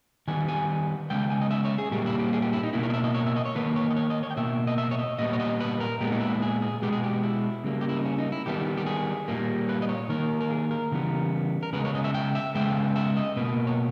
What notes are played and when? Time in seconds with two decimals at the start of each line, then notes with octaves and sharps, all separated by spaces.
0.28 D#3 G3 B3 G#5
0.48 G#5
1.10 C#3 G#3 B3 G5
1.30 G#5
1.41 D#5
1.51 E5
1.65 C#5
1.78 G#4
1.91 A#2 G3 A#3 G4
2.06 E4
2.19 G4
2.33 G#4
2.42 G4
2.53 E4
2.63 D#4
2.73 B2 A#3 E4
2.83 C#5
2.90 D#5
2.94 E5
3.04 D#5
3.14 C#5
3.26 E5
3.36 D#5
3.45 C#5
3.55 D#3 A#3 B4
3.76 C#5
3.90 D#5
3.96 C#5
4.10 D#5
4.23 C#5
4.31 G5
4.37 B2 A#3 E5
4.67 D#5
4.78 E5
4.91 C#5
4.99 D#5
5.19 A#2 G3 B3 D#5
5.33 C#5
5.40 D#5
5.60 B4
5.80 A#4
6.01 A#2 G#3 B3 G4
6.12 D#4
6.21 E4
6.42 G#4
6.62 G#4
6.82 B2 G#3 B3 G4
6.92 G#4
7.04 G4
7.23 E4
7.64 C#3 G3 A#3
7.81 G4
7.89 E4
7.97 D#4
8.05 C#4
8.18 D#4
8.32 E4
8.46 D#3 G3 B3 G4
8.77 G4
8.86 G#4
9.28 A#2 G3 A#3
9.69 B4
9.82 D#5
9.89 C#5
10.09 D#3 A#3 A#4
10.41 A#4
10.51 G#4
10.71 A#4
10.92 C#3 E3 G3 B3
11.63 A#4
11.73 C#3 G#3 B3 B4
11.85 C#5
11.95 D#5
12.04 E5
12.14 G5
12.35 E5
12.55 C#3 G#3 B3 G5
12.96 E5
13.17 D#5
13.36 B2 A#3 B4
13.67 C#5